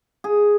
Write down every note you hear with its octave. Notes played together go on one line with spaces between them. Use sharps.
G#4